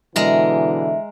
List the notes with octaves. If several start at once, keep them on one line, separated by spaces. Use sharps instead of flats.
B2 D3 E3 G#3 A#4 E5